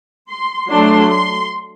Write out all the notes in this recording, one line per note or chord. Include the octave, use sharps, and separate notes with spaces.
C6
F#3 A3 D4 C6
C6